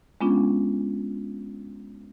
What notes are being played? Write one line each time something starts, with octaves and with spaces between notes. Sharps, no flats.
G#3 B3 C#4 D4 F4